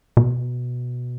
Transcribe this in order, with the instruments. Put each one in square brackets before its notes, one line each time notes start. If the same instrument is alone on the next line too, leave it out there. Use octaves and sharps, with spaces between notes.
[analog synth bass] B2